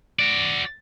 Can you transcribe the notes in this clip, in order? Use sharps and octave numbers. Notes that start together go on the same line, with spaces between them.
F#4 D5